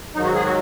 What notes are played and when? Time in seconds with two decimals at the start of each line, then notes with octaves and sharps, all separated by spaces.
0.14 G#2 D#3 F#3 D#4
0.24 F#4
0.34 G#4
0.44 F#4